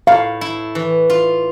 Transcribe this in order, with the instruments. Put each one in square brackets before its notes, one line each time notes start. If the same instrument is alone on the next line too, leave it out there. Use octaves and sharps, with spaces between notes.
[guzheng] A2 [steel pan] F5
[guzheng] E4
E3
F4